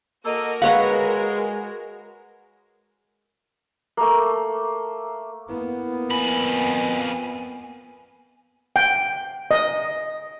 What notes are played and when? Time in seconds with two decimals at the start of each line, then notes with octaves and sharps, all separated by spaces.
0.25 A#3 F#4 A4 A#4 D#5
0.62 G#3 B4 C#5 F5 F#5 C#6
3.97 A3 A#3
5.49 A#3 B3 E4
6.10 F2 G#5 B5
8.76 G5
9.51 D#5